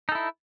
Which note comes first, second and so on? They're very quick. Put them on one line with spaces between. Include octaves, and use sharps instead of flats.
D#4 A4 E4